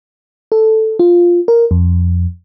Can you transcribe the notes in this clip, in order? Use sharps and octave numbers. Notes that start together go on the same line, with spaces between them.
A4
F4
A#4
F2